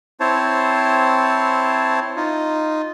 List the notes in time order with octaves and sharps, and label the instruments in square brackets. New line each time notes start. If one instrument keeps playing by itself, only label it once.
[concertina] C4 E4 C5 C#5 A5
D#4 F4